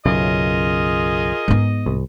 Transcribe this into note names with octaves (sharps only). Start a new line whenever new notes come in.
B1 F#2 C#3 F4 G#4 A#4 D#5
G#2 B3
C2